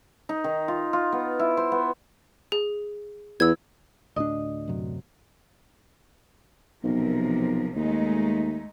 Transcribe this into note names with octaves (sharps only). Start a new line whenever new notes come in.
D#4
D#3
F4
F4
B3
E4
C5
B3
G#4
E2 E6 G#6
D2 A2 D4 D#5
F#2 C3 F#3
B1 C3 F3 A#4
D#2 G#3 A3 D#4